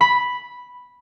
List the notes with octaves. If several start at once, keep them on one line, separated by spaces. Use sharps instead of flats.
B5